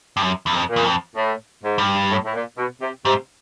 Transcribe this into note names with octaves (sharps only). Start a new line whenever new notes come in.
G2
F#2
E2
F2
A#2
E2
F2
A2
G#2
G2
A2
A2
A#2
B2
C3
G#2 C3